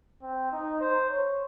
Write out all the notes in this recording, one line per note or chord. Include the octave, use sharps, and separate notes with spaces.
C4
D#4
C5
C#5